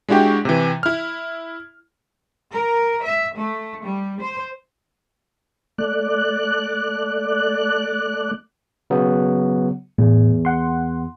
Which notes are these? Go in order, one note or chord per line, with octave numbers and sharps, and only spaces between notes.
G#3 D4 E4 F#4 G4
C3 E3
E4 F6
A#4
E5
A3
G3
C5
A3 D5 F#6
C#3 F#3 B3
E2 A2
F#5 C6